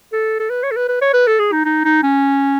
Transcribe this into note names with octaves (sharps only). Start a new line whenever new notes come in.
A4
A4
B4
C#5
A4
B4
B4
C#5
B4
A4
G#4
D#4
D#4
D#4
C#4